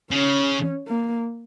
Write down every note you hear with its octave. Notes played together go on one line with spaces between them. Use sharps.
C#3 C#4
A#3